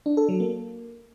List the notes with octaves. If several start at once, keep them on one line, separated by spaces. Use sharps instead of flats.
D4
A4
F#3
A#3